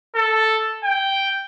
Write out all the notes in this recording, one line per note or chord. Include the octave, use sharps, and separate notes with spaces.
A4
G5